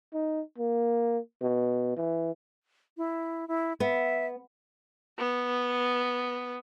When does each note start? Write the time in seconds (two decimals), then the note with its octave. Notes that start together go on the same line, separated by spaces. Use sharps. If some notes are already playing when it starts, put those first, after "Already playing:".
0.14 D#4
0.58 A#3
1.42 B2
1.97 E3
2.97 E4
3.48 E4
3.80 B3 E5
5.19 B3